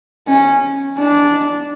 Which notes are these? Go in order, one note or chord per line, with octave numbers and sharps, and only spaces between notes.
C#4
D4